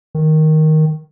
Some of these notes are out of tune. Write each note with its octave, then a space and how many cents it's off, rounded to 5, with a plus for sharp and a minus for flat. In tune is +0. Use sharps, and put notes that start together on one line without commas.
D#3 +5